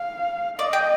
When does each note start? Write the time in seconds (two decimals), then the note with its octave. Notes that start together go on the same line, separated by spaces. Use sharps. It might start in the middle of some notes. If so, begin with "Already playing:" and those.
Already playing: F5
0.59 D5 D#5
0.73 G5